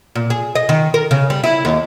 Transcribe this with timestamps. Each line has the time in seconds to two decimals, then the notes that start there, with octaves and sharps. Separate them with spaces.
0.15 A#2
0.30 G#4
0.55 D#5
0.69 D#3
0.94 A#4
1.11 C#3
1.30 G3
1.44 E4
1.65 D#2